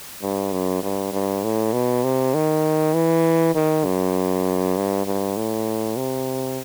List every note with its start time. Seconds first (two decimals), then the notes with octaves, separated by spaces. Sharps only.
0.23 G2
0.52 F#2
0.83 G2
1.13 G2
1.44 A2
1.73 B2
2.04 C3
2.35 D#3
2.94 E3
3.55 D#3
3.85 F#2
4.77 G2
5.06 G2
5.37 A2
5.98 C3